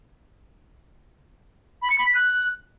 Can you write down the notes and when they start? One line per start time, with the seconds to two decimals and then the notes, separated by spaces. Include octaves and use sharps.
1.82 B5
1.90 C#7
1.98 B5
2.07 B6
2.15 F#6